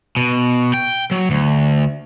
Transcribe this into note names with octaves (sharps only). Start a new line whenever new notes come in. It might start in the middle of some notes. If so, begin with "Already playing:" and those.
B2
G5
F#3
D2